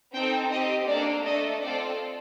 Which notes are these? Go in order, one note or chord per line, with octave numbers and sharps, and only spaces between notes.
C4 D#4 A4 G5
C4 G4 D#5
A#3 D4 A4 D5
A3 D4 A4 D#5
C4 F4 A4 D5